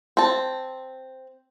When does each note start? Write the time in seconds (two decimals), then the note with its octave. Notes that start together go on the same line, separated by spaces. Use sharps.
0.17 C4 A5